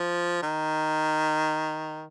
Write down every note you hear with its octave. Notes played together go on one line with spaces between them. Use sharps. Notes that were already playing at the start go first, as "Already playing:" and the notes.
Already playing: F3
D#3